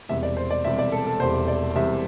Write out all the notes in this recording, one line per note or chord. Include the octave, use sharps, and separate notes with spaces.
E1 E2 C3 G3 E5
D5
C5
D5
E1 E2 C3 G3 E5
D5
A4
A4
E1 E2 C3 G3 C5
D5
E1 E2 C3 G3 E5